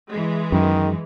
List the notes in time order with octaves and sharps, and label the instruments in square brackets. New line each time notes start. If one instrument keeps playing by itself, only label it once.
[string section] E3 G#3
[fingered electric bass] F#2 [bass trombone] D#3